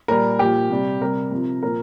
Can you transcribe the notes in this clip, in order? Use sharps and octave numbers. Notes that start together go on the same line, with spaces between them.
A#2 G3 A#4
A#2 F3 G4
C3 G3
C3 G3 A#4
C3 F3
A#2 F3 A#4